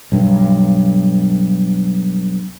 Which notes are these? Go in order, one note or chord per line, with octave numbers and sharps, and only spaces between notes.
B1 G2